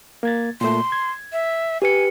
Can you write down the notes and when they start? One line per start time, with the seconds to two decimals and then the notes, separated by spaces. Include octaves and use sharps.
0.23 A#3 G#6 A6
0.61 A#2 A3 C6
0.92 G#6
1.33 E5
1.82 G4 B4 G#5 C#7